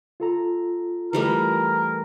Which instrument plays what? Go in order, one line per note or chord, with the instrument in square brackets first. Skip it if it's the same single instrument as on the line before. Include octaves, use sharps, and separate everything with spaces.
[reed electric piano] F4 A4 A#5
[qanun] E3 G3 A3 [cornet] A#4